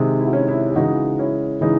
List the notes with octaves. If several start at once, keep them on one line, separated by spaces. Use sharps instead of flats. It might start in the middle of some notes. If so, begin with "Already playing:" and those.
Already playing: C3 D#3 G#3
E4
F#4
C#4 E4
C#4 E4
G#4
C#3 E3 G#3 D#4 F#4
C#4 E4
C#3 E3 G#3 D#4